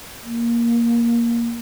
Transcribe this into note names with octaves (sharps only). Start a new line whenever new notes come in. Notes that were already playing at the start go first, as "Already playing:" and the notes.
A#3